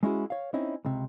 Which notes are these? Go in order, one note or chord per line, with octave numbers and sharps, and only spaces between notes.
G#3 C#4 E4 F#4 G#4
C#5 F5
C4 C#4 D#4 E4
C#2 C3